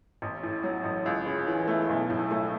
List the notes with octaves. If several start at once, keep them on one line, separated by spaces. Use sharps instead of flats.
A1
A2
F#3
A1
C#2
C#3
E3
A3
B1
A2
A3